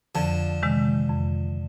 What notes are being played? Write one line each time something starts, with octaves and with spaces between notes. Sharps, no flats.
F2 D3 F3
C3 D#3 G#3
F2